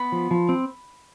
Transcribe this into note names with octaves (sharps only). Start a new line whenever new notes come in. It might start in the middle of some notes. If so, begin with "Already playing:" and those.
Already playing: B3 B5
F3
F3
C4